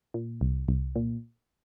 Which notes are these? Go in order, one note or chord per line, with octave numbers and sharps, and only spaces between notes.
A#2
C2
C2
A#2